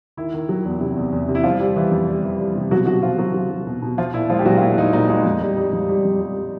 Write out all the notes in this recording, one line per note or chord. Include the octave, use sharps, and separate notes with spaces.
D#3 E4
D#3
F#3
E2
C3
E2
E2
C3
E4
F3 G3 F4
G3
E3
F2
G3
E3
G3
C3
B2 F#3 F#4
B2 F#3 F#4
B2 F3 F4
F#3 F#4
F#3
F#3
B2
B2
F3 F4
A#2 E4
F3 G#3 F4
G4
A#2 F#3 F#4
F4
A#2 E4
F3 D#4
A#2 D#4
G#3 D#4
F2
G3
G3
F2
G3
F2
G3
G3